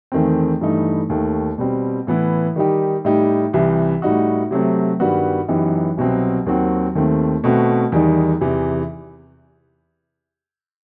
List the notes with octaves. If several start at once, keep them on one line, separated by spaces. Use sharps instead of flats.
E2 D#3 A3 C4
G2 E3 A3 D#4
D#2 D#3 A3
B2 G3 C4
A2 E3 B3 E4
D#3 G3 D#4 G4
A2 G3 D#4 G4
C2 C3 E3
A2 G3 D#4 F#4
C3 F#3 A3 C4
G2 D#3 G3 B3 F#4
F#2 E3 B3 D#4 G4
C2 B2 F#3 C4
D#2 D#3 F#3 C4 F#4
D#2 D#3 A3 C4
B2 A3 C4 F#4
E2 D#3 G3 D#4
E2 C3 E3